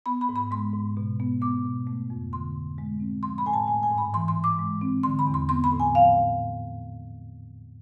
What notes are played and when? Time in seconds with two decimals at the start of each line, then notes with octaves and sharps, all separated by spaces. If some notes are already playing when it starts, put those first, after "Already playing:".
0.06 B3 B5
0.21 B5
0.29 G#2
0.36 B5
0.51 G#3 C6
0.74 G#2
0.97 B2
1.20 B3
1.42 B3 D6
1.65 B2
1.87 A3
2.10 F2
2.33 D3 C6
2.55 F2
2.78 G#3
3.00 C4
3.23 F3 C6
3.38 B5
3.46 A2 G#5
3.53 A5
3.68 A3 G#5
3.83 G#5
3.91 G#2
3.98 B5
4.14 E3 C6
4.28 C6
4.36 G#2
4.44 D6
4.59 G#3
4.81 C4
5.03 D3 C6
5.19 B5
5.27 E2
5.34 C6
5.49 B3 C6
5.64 B5
5.72 A2
5.80 G#5
5.94 F3 F5
6.17 A2